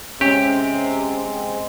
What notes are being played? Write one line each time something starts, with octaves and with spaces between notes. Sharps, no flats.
C3 G#3 C4 C#4 G4